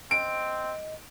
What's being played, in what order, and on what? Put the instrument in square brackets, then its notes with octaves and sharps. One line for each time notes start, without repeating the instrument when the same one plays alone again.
[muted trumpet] C4 [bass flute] D#5 [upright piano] D7